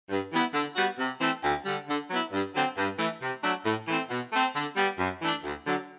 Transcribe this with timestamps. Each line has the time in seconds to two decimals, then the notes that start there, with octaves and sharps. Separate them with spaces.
0.09 G2
0.32 E3 G3 B3 E4
0.54 D3
0.76 G3 B3 F#4
0.99 C3
1.21 E3 A3 C4
1.43 D2
1.65 D3 G3
1.88 D3
2.10 F#3 B3 E4
2.32 G2
2.54 D3 F#3 C4
2.77 G2
2.99 E3 A3
3.22 C3
3.43 F#3 A3 D4 F#4
3.65 A2
3.88 E3 A3 C4
4.10 B2
4.32 A3 C4
4.55 D3
4.77 G3 B3
4.99 F#2
5.22 E3 A3 D4
5.44 D2
5.66 D3 F#3